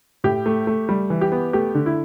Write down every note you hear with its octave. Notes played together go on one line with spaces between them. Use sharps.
A2 G4
A3
A3
G3
E3
G4
B3
A3 G4
D3
E4